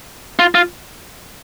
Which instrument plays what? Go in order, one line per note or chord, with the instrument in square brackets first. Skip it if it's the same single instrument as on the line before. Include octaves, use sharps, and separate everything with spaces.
[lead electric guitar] F4
F4